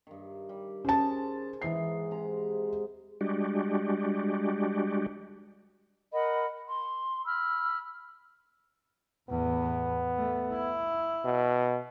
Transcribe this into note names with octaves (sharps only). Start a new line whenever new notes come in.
G2 D#3
G3
C#4 G#4 C5 A5
G#2 E3 D#4 C7
C3 G#3 A#5
G3 G#3 D4 F#4 G4
A#4 D#5 F#5 B5
C6
B5 E6 F6
E2 A2 B3
A3
E4
B2